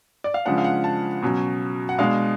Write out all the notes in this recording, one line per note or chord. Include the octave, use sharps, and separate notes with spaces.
D5
F5
C#3 F3 G#3 D4 F#5
F5
F#5
A5
B2 F#3 C#4
F#5
B2 G#3 D4 F5